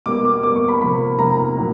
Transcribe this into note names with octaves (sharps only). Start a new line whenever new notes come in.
B2 G3 A#3 D6
D6
B2 G3 A#3 D6
C#6
B5
C3 F3 A#3 B5
C3 F3 A#3 A#5
A2 F#3 A#3